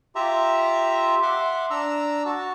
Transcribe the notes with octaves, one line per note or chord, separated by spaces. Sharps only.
F4 G4 E5 A#5
E5 F#5 C6 D6
D4 A#5 E6
F#4 A5